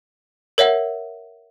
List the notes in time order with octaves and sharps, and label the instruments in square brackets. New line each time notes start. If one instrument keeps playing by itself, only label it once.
[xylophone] A#4 C#5 E5 F#5